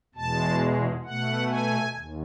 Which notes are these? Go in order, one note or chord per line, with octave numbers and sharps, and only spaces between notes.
E2 B2 G#3 A5
B2 A3 F#5
G#5
D#2